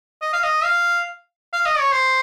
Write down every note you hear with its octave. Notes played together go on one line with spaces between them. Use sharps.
D#5
F5
D#5
F5
F5
D#5
C#5
C5